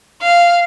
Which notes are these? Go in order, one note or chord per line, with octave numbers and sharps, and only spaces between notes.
F5